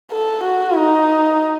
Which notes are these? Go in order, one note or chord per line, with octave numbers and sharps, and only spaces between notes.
A4
F#4
D#4